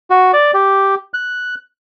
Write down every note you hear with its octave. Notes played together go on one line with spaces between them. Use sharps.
F#4
D5
G4
F#6